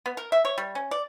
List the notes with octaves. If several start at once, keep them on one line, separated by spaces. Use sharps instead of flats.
B3
A#4
E5
C#5
G3
C#4
D5